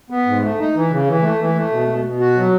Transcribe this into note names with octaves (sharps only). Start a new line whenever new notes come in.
B3
G#2
A3
D#4
E3
C#3
E3
A3
E3
A3
B2
B2
B2
F#4
F#3